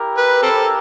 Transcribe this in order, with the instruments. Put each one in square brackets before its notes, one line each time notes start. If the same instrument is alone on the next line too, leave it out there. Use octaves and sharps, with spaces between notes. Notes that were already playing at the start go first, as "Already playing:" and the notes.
Already playing: [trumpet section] E4 G4 A#4
[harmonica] B4
C4 A4